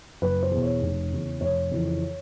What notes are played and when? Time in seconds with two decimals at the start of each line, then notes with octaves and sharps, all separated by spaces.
0.22 F#1 B4
0.43 C5
0.51 E2 B2
0.62 C#5
0.82 F1
1.11 E2 C#3 E3
1.41 F1 C#5
1.71 F2 C#3 E3